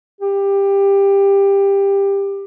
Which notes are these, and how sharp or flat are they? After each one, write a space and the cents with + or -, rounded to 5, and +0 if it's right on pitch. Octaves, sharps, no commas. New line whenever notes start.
G4 +15